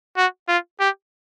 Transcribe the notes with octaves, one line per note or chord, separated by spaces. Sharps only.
F#4
F4
G4